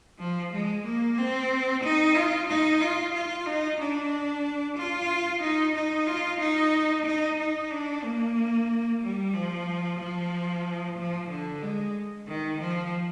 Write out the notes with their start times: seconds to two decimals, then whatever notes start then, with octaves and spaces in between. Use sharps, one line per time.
0.19 F3
0.52 G#3
0.85 A#3
1.18 C4
1.83 D#4
2.16 F4
2.48 D#4
2.81 F4
3.14 F4
3.46 D#4
3.79 D4
4.77 F4
5.41 D#4
5.75 D#4
6.07 F4
6.40 D#4
7.05 D#4
7.39 D#4
7.71 D4
8.04 A#3
9.01 G3
9.34 F3
9.99 F3
10.97 F3
11.30 D3
11.62 G#3
12.27 D#3
12.61 F3